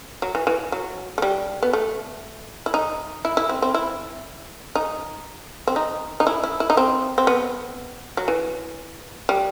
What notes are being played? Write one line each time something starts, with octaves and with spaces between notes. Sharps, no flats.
F#3
E3
E3
F#3
A3
G3
B3
A3
E4
D#4
E4
E4
C4
C4
E4
D#4
C4
D#4
D#4
E4
E4
E4
D#4
C4
C4
B3
F#3
E3
G3